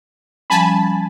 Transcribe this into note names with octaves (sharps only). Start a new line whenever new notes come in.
F3 G3 C#4 G#5 A5 B5